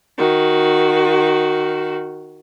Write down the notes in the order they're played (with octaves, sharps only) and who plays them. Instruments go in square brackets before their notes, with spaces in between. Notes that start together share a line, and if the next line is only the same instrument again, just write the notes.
[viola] D#3 F#4